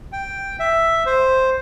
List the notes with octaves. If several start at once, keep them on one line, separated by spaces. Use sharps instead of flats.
G5
E5
C5